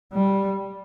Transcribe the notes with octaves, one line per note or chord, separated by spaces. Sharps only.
G3